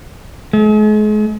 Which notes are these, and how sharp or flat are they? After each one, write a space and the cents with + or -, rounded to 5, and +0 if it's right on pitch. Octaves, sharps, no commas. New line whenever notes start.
G#3 +40